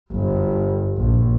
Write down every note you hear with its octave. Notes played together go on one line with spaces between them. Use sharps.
G1
A#1